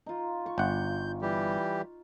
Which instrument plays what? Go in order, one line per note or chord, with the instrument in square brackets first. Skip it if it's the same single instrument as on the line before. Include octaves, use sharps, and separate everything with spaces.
[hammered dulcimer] D#4 F4
C#6
[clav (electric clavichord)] G1 F#5 [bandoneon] G6
[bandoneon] E3 G3 G4